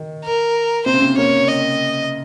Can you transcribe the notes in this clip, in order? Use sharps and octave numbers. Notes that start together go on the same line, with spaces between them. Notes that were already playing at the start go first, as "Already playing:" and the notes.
Already playing: D#3
A#4
C3 C5
C#3
C3
A#3 C#5
D#5